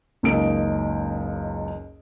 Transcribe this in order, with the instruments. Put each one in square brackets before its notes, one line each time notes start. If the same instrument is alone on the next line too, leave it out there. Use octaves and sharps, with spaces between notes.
[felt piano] F#1 C#2 D#4 A#4 D#5 D7